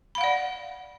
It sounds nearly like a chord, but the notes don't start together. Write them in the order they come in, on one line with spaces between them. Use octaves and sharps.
B5 F5 F#5 D5